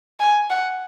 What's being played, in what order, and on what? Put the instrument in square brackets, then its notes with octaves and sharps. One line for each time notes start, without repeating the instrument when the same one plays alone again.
[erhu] G#5
F#5